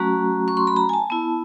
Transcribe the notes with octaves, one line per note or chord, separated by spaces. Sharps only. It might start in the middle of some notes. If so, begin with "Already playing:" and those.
Already playing: F#3 A3 C#4 F#4 A#5
C#6
C6
B5
A#5
G#5
A5
B3 E4